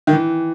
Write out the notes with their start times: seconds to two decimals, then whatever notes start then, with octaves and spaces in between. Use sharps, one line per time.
0.07 D#3
0.13 E3